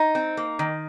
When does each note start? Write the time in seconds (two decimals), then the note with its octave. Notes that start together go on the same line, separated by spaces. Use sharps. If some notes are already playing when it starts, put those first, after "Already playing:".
Already playing: D#4
0.15 C4
0.37 A#3
0.59 D#3